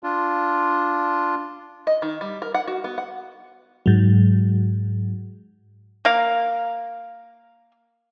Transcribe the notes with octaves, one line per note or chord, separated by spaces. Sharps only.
D4 F4
D#5
D#3
G3
A#4
F#5
F#4
B3
F#5
G#2 F#3
A#3 A#4 F5